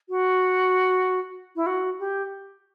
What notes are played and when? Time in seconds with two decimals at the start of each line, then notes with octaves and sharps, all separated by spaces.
0.09 F#4
1.55 E4
1.66 F#4
1.99 G4